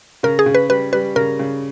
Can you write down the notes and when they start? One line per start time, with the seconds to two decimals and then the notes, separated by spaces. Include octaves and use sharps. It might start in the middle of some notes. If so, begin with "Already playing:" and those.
0.23 C#3 A#4
0.39 G#4
0.46 C#3
0.55 B4
0.69 G3 B4
0.93 G3 B4
1.16 C#3 A#4
1.39 C#3